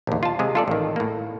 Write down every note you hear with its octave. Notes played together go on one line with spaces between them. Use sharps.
A#1 D#2
F4 A5
C3 G#3 G#4
F4 A4 D5
A1 D#3
A2 A#3